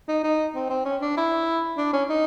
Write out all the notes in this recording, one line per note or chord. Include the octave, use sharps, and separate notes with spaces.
D#4
D#4
C4
C4
C#4
D4
E4
D4
C#4
D#4